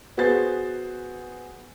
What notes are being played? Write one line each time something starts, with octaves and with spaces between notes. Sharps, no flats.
B3 F#4 G#4 C5 A6